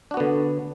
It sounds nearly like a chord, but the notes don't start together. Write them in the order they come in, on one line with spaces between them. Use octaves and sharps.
D4 F#4 B3 D3